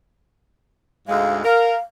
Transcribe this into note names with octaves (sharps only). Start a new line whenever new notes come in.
D2 G#2 G#3 F5
A#4 F5